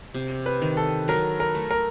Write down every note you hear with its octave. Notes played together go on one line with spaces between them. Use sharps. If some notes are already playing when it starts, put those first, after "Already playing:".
C3
B4
D#3
A4
F#3 A#4
A#4
A3
A#4